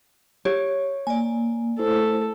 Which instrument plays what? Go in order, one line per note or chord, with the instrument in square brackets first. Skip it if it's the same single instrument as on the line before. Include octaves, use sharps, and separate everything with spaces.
[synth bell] G4 [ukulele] C#5
[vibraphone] A#3 [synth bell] D5 G#5
[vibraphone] A3 E4 C5 [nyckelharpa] A4